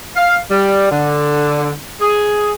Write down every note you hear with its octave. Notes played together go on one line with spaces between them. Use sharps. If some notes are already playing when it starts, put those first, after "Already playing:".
F5
G3
D3
G#4